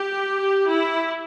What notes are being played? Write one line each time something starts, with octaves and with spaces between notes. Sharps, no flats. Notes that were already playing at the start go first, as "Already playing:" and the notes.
Already playing: G4
E4